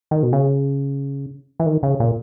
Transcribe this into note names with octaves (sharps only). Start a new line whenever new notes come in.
D#3
B2
C#3
E3
D#3
C#3
A#2